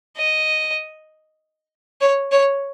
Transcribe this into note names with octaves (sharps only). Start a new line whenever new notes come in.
D#5
C#5
C#5